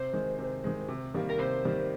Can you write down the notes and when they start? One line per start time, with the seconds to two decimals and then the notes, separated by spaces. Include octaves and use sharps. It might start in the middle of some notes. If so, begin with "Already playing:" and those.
Already playing: C3 C5
0.13 D#3 G#3
0.39 C3
0.64 D#3 G#3
0.88 C3
1.14 D#3 G3 A#3
1.30 A#4
1.38 C3 C5
1.65 D#3 G3 A#3